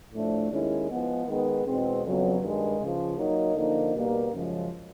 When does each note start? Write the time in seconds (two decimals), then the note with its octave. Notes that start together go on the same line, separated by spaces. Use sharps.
0.12 A2 F3 A3 D4
0.50 D#2 D#3 G#3 C#4 E4
0.89 F3 G#3 B3
1.27 D#3 G#3 B3
1.65 E2 B2 G#3 C4
2.03 F2 C#3 F#3 B3
2.41 G2 D#3 G#3
2.79 C#2 C#3 F3
3.17 F#3 A#3 D#4
3.55 D3 F3 A#3 D#4
3.94 B2 G3 A#3
4.31 F#2 C#3 F3 G#3